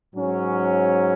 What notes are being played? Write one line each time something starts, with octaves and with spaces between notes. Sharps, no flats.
G#2 F#3 C#4